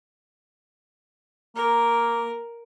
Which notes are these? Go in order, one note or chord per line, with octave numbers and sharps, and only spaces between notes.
A#3 A#4